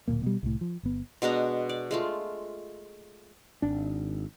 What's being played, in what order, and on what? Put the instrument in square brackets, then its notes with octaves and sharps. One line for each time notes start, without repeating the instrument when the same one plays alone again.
[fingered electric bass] D1 C2 A#2 A#3
B2 G3
C2 A2
F3
G1 B3
[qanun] B2 G#3 D4 A#5
D5
G#3 A3 F4
[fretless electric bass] G#1 D4